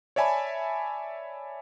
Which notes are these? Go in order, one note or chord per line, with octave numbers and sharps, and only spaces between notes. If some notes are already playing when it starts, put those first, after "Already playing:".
C#5 D5 E5 G#5 A5 B5